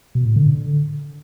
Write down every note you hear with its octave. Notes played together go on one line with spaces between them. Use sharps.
B2
A2
D3